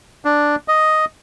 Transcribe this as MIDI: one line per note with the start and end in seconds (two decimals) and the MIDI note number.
0.25 0.56 62
0.68 1.05 75